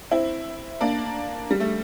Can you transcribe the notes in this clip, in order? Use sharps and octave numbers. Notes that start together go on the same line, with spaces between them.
C4 E4
A#3 D4
G3
A3